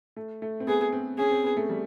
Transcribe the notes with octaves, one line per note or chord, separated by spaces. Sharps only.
A3
A3
C4
B3 G#4
C4
C#4 G#4
C4
B3
A3
G3